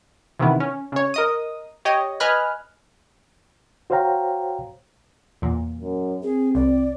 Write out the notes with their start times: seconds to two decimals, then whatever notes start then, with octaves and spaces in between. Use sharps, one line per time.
0.39 C3 D#3 E3 B3 E4
0.60 C#4
0.92 C#3 C#5
1.14 A#4 D#5 D#6
1.85 G4 C#5 D#5
2.20 B4 D#5 G#5 B5 F6 F#6
3.90 F#4 C5 C#5 F5 G5 A#5
5.42 E2 A#2
5.80 F#2
6.23 C4 G#4
6.55 C2 D5